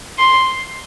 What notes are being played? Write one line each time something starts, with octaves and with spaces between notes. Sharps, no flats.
C6